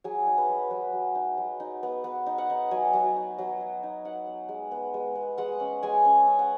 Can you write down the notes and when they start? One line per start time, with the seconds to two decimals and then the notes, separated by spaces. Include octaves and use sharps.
0.04 F#3 G#4
0.27 D#4
0.38 B4
0.48 F#3
0.71 F#3 B4
0.93 F#3
1.15 D#4
1.37 F#3
1.60 D#4
1.83 B3
2.04 B3
2.26 D#4
2.38 F#5
2.50 D#4
2.71 F#3 G#5
2.93 F#3
3.16 D#4
3.38 F#3
3.60 D#4
3.83 D#4
4.04 D#4 F#5
4.27 B3
4.49 G#3
4.71 B3
4.94 G#3
5.15 B3
5.38 G#3 F#5
5.60 C#4
5.83 G#3 G#5
6.05 C#4
6.27 C#4
6.39 F#5